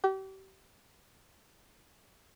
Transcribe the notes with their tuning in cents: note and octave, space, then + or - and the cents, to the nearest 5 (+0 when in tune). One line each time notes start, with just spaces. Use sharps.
G4 -35